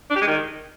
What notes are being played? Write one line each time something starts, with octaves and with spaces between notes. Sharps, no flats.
D4
G4
G#3
D#3